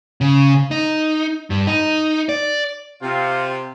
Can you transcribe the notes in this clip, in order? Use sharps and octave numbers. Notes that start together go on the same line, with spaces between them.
C#3
D#4
G2
D#4
D5
C3 C4 F4